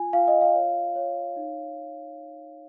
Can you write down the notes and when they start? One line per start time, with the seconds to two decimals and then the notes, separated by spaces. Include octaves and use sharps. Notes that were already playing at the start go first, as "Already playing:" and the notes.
Already playing: F4 G#5
0.13 F4 F5
0.28 D#5
0.41 F5
0.54 C#5
0.96 C#5
1.36 D#4